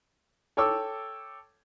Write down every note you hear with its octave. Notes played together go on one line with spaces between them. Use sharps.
A4 C#5 G5 A5 D6 E6